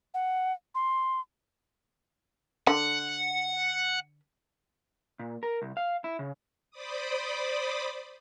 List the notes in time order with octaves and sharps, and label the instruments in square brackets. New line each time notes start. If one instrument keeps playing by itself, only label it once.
[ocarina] F#5
C6
[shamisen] D3 [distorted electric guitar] F#5
[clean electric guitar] A#2
A#4
C2
F5
E4
C#3
[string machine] C5 D5 B5 D6 D#6